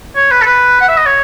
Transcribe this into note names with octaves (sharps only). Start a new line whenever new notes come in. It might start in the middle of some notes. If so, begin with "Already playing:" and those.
C#5
B4
A4
B4
F#5
E5
D#5
C#5